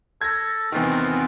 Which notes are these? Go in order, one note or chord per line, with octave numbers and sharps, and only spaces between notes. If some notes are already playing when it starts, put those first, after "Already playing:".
A4 G#6 A#6
E2 C3 D#3 B3 C4 F4